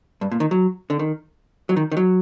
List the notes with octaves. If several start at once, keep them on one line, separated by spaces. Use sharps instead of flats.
G2
A#2
D#3
F#3
D3
D#3
F#3
D#3
D#3
F#3